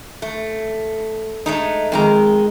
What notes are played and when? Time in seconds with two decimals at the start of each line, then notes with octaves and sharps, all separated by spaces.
0.22 A3
1.46 G#3 A3 D#4
1.92 F2 D#3 G#3 A#5